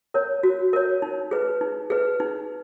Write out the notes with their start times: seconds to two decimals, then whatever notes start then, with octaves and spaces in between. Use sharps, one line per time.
0.14 A#4 C#5
0.43 F#4
0.73 A#4 C#5
1.02 D#4
1.31 G#4 B4
1.61 D#4
1.90 G#4 B4
2.20 D#4